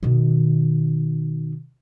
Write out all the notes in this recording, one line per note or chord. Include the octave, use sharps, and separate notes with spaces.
B2 D#3